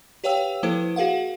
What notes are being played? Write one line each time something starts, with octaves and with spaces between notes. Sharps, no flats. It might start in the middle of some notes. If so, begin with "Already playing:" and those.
G4 B4 C#5 F5 G5 E6
F3 A#3 E4 A4 B4 C5
F#4 G#4 A#4 F5 F#5